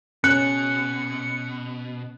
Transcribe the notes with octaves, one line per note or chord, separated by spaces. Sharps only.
B2 C#4 F#6 C#7